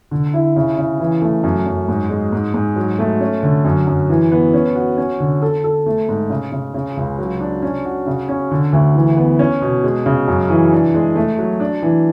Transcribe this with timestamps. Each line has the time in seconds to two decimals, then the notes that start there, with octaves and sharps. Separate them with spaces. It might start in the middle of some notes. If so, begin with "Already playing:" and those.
0.11 D3
0.34 E4
0.56 C#3
0.78 C#3
1.00 E3
1.22 A3
1.43 F#2
1.66 F#2
1.88 G#2
2.10 G#3
2.33 G#2
2.54 G#2
2.76 F#3
2.99 A3
3.20 C#4
3.43 D3
3.65 F#2
3.87 F#2
4.09 E3
4.32 B3
4.54 C#4
4.75 F#4
4.98 C#4
5.20 D3
5.42 A4
5.64 A4
5.86 A3
6.09 G#2
6.30 C#3
6.52 C#3
6.74 C#3
6.97 C#2
7.19 F#3
7.40 D4
7.62 C#4
7.85 F#4
8.07 C#3
8.28 C#4
8.51 D3
8.73 D2
8.95 E3
9.17 B3
9.39 C#4
9.62 B2
9.84 G#3
10.06 C#3
10.28 F#2
10.50 E3
10.72 D4
10.94 G#3
11.16 A3
11.39 F#3
11.60 D4
11.82 E3